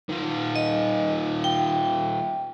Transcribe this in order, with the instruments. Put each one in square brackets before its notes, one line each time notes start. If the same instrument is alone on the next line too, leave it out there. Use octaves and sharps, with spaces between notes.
[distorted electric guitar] D#3 F4
[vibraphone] D#5
G5